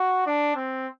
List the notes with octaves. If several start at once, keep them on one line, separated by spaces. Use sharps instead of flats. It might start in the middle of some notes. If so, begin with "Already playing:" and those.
Already playing: F#4
D4
C4